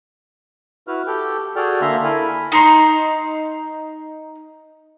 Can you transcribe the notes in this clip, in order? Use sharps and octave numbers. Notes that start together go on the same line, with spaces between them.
E4 F#4 B4 F6
G4 A4 G5
F#4 G#4 A4 D5 G5 F6
D3 A#3 A4 E5 A#5 C6
E4 A4 A#4 G#5 B5
D#4 A#5 C6